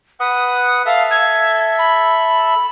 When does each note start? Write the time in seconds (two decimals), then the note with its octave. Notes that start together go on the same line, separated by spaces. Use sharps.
0.20 B4 F#5 D#6
0.86 A4 E5 F5
1.11 G#6
1.79 B5